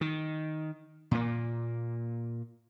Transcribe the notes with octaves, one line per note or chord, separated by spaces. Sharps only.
D#3
A#2 A#3